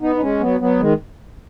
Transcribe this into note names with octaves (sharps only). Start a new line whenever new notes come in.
B3 D#4
D#4
G#3 C#4
F#3 B3
F#3 B3
D#3 G#3